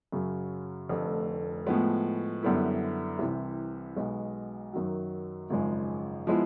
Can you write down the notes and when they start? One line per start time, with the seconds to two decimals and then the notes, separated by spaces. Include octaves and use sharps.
0.12 F#2 C#3 F#3
0.89 F1 F2 D3 F3 A3
1.67 A2 F3 G#3 B3
2.43 F#2 D3 G3 B3 E4
3.19 C2 C3 E3
3.97 B1 B2 G#3
4.73 F#2 D#3 F#3
5.50 G#1 F#2 C#3 F3 G#3
6.27 F3 G#3 B3 E4